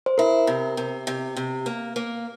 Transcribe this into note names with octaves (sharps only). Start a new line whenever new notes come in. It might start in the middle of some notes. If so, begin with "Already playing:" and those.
C5
E4 A#4
C3
C3
C3
C3
A#3
A#3